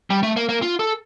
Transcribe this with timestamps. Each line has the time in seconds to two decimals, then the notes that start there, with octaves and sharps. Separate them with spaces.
0.10 G3
0.23 A3
0.36 A#3
0.49 A#3
0.62 F4
0.79 A4